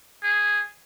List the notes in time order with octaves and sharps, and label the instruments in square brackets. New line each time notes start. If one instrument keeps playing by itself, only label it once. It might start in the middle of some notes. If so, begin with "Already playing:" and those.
[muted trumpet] G#4